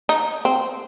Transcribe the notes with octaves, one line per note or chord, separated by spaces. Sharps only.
D#4
C4